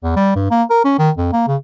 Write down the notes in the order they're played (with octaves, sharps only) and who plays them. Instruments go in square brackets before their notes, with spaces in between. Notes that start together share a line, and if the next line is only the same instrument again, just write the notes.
[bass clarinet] E2
G3
G2
A#3
A#4
C#4
D#3
F2
A#3
C#3